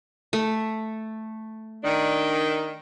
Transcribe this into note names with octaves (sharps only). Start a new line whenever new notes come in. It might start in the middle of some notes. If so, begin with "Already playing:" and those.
A3
D#3 D4